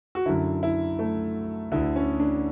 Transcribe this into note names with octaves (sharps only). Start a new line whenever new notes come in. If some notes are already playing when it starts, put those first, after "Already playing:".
F#4
F#2 D3 E4
E4
A3
D2 D3 E4
C#4
D4